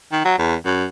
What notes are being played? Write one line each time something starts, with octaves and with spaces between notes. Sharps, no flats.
D#3
F#3
E2
F#2